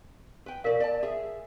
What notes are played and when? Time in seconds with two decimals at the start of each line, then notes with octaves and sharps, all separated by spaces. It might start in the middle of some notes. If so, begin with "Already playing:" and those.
0.46 B4 G5
0.64 B2 A#4 D5 F5
0.80 D5 A5
1.03 G#4 E5